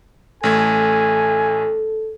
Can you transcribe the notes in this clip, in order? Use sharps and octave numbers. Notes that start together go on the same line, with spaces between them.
A1 A3 A4 G#5 G#6